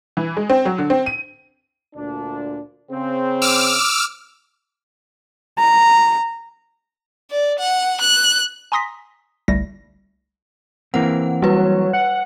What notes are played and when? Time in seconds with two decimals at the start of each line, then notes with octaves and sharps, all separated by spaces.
0.17 E3
0.37 G#3
0.50 C4
0.65 F#3
0.78 D3
0.90 C4
1.06 D#7
1.95 D2 A#2 D4
2.90 C#3 C4
3.42 D6 E6 F6
5.59 A#5
7.31 D5
7.59 F#5
8.01 F#6
8.72 G#5 A#5 C6 D#6 A#6 B6
9.48 G1 C2 G3 A3 A#6
10.94 E3 A#3 C4 F#5
11.42 F#3 G3 B4
11.93 F#5